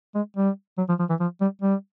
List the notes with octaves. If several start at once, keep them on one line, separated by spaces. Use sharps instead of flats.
G#3
G3
F#3
F3
F3
E3
F3
G3
G3